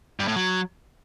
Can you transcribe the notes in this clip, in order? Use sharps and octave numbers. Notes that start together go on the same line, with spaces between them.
G2
A2
F#3